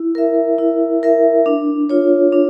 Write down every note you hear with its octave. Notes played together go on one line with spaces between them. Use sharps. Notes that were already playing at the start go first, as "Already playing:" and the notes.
Already playing: E4
A#4 E5
E4
A#4 E5
D4
F4 C#5
D4